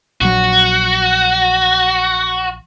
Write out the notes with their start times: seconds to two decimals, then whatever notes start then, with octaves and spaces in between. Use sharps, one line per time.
0.21 A#1 F#3 F#4